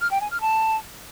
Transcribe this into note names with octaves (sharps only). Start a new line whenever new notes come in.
F6
G5
G#5
F6
A5